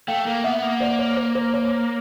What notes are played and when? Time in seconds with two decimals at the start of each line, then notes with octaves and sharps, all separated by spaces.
0.08 A3 F5 G5
0.27 A#3
0.44 B3 E5 F#5
0.62 A#3
0.80 C5 D5
0.99 C#5
1.17 C5
1.35 C5
1.54 C#5